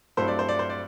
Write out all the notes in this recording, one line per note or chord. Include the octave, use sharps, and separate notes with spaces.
G2 F#3 A3 C4 E4 C5
D5
C5
D5
C5
D5